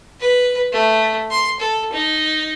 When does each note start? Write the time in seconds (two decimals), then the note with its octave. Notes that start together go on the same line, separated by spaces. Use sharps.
0.20 B4
0.72 A3
1.31 C6
1.60 A4
1.92 D#4